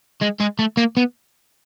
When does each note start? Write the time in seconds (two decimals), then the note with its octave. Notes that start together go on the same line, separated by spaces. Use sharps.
0.21 G#3
0.40 G#3
0.59 A3
0.77 A#3
0.97 B3